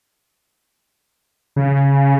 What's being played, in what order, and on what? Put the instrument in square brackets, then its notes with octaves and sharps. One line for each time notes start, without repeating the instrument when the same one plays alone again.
[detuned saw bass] C#3